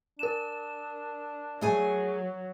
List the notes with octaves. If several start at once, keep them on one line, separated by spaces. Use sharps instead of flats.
D4 A#4 E7
F#3 A3 G#4 G#5